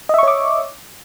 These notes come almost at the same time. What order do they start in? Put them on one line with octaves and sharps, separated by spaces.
D#5 E5 C#6 C#5 D6